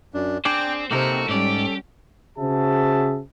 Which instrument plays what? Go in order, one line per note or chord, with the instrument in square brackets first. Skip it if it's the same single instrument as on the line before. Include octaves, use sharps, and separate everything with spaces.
[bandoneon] F#2 D4
[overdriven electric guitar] C4 C5 [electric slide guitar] D4 G#4 D5 [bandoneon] G5
[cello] C3 C4 [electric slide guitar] A#3 D#4 A#4 [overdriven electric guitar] F#4 [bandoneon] A4
[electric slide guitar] G#2 D5 [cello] G3 C#4 [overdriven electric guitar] G4
[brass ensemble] C#3 F#4 G#4 C5 E5 A5